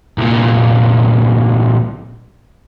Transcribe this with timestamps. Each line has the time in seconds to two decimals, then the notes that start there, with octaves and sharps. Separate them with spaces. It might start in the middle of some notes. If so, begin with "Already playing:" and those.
0.18 C2 A#2